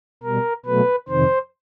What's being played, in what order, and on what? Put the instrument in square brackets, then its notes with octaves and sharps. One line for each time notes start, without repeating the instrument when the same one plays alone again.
[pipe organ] B2 G3 A#4
B2 F#3 A3 B4
F2 C3 D#3 C5